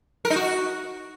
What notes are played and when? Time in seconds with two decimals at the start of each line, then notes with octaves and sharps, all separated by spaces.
0.25 A#4
0.30 D#4
0.36 F#4